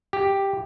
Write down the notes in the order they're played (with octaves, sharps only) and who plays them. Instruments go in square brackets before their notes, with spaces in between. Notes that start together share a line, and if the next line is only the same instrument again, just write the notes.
[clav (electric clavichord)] G4